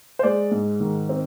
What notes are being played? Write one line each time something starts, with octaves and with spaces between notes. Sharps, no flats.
C5
G#3 D5
G#2
D#3
C4